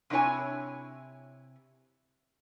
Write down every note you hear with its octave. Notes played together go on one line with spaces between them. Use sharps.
C3 D4 E4 C#5 G#5